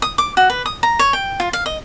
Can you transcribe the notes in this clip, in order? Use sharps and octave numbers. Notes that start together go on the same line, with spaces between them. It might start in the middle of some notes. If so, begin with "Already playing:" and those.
D#6
D6
F#4
B4
D#6
A#5
C#5
G5
F4
F5
D#5